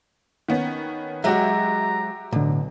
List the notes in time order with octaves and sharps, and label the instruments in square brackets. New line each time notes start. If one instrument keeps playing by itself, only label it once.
[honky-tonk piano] D#3 B3 C#4
[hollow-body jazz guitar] F#3 G#3 [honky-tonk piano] F#4 G4 E5 [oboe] A#5
[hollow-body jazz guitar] B1 [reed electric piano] A2 D3